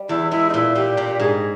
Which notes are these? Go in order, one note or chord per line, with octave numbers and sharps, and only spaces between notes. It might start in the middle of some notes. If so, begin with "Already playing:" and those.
Already playing: G3
E2 E4
G#3 E4
D#4
A#2 E4
A#2 G4
A#2
G#2 G#4